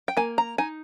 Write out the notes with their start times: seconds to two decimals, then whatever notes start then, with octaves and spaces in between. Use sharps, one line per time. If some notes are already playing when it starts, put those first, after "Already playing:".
0.08 G5
0.17 A#3 G#5
0.38 A#5
0.58 D#4 G#5